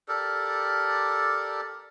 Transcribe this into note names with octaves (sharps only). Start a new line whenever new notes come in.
G4 A4 A#4 D5